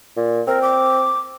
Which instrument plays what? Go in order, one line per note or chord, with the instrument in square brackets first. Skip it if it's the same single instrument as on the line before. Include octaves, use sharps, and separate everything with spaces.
[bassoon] A#2
[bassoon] C4 [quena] A#4
[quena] D6